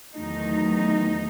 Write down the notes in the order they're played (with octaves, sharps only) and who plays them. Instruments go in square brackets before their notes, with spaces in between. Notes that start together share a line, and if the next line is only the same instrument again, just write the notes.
[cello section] E2 D#3 F#3 A3 D#4